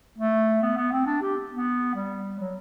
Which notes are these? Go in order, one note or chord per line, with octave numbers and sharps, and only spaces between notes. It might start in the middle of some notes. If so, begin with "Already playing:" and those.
A3
B3
B3
C4
D4
G4
B3
G3
F#3